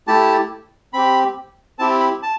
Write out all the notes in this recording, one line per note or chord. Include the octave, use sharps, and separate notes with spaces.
A3 E4 G4 A5
C4 G4 B5
C4 E4 G4 A5
B5
A5